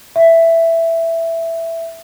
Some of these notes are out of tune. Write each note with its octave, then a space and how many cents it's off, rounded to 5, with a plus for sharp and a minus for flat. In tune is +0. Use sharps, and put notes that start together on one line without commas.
E5 +5